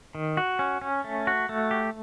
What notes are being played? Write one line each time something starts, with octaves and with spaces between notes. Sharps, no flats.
D#3
F#4
C#4
C#4
A3
F#4
A3
G4